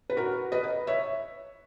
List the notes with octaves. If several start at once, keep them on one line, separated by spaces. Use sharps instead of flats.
B4
F#4 A#4
B4 D#5
C#5 E5